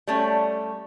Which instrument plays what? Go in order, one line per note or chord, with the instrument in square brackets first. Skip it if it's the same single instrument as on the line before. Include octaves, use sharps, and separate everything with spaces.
[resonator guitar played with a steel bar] G3 A3 C#4